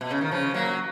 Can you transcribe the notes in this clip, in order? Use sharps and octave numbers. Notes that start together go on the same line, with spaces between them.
B2
C#3
D#3
C#3 F3
F#3 A#3